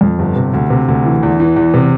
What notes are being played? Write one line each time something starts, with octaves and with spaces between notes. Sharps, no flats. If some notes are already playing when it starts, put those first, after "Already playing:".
F2
G1
C3
D2
C3
D2
E3
E2
E3
E2
C3